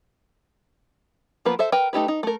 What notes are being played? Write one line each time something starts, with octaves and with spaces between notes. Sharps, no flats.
F3 A#3 B3 B4
A4 C5 E5
A#4 B4 G5
A3 D#4 G4 B4
D#4
A3 A#4